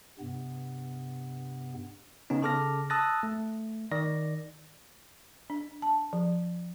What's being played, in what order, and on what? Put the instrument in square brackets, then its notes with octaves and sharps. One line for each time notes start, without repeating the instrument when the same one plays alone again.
[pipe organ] G2 C3 B3
[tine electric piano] C#3 B3 C#4 D#4
C#3 A4 A5 D6 F6 A#6
A5 D#6 E6 F#6 A6 A#6
A3
D#3 D5 A#6
[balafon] D4
A5
F3